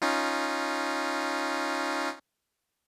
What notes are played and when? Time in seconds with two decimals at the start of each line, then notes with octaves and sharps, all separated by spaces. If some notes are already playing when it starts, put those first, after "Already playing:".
0.02 C#4 D#4 F4